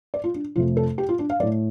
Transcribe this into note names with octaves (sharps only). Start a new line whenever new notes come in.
D5
F4
D4
F2 C3 A3 F4
A4
G4
F4
D4
F5
A2 A3 D5